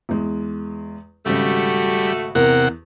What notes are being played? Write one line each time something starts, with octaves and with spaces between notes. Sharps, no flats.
E2 G#3
G#1 C#3 G3 A3 F#4
E2 C3 A#4 F#5